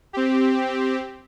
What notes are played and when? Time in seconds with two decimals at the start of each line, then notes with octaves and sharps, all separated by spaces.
0.13 C4 G4